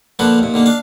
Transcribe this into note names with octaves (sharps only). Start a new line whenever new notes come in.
D3 F3 A#3 A4 B4
D#2 A#2
D#2 D3 A#3
D4 F5